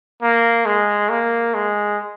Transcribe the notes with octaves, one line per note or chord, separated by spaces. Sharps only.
A#3
G#3
A#3
G#3